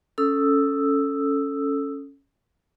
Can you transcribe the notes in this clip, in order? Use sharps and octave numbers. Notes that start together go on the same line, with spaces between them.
C#4 A4 D#6 E6